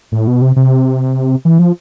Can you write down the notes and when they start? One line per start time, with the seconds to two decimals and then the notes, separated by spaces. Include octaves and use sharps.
0.12 A2
0.27 B2
0.42 C3
0.56 C3
1.45 E3
1.59 F3